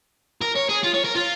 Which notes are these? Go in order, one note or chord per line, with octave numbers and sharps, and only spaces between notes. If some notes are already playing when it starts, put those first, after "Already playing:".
A#4
C#5
G#4
F4
C#5
A#4
F4